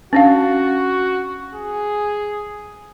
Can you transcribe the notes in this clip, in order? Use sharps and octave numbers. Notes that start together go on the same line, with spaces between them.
C#4 D4 F#4 F5
G#4